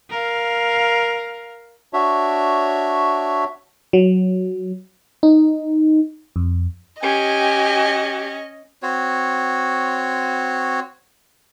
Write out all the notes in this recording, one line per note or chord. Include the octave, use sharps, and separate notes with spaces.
A#4 F5
D4 F#4 C#5 E5
F#3
D#4
F2
C#4 G4 D#5 G#5
C4 F#4 C#5